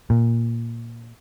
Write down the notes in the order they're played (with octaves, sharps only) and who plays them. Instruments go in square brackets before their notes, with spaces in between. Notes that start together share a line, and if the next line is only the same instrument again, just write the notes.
[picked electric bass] A#2